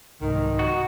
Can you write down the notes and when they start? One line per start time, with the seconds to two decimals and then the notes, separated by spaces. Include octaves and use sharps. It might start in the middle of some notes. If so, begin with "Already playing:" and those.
0.21 C2 G#2 D#3 D#4
0.59 F#4